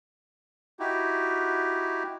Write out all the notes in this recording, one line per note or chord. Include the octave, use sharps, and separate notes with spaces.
D#4 E4 F#4 G4